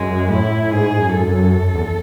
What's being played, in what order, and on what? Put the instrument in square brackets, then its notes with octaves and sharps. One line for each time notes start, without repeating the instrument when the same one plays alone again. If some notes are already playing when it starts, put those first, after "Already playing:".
Already playing: [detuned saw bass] F#2 [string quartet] G#3
[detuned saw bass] A2 [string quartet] E4
[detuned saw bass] G#2 [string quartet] G#4
[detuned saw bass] F#2
[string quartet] A4
[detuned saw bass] F#2
E2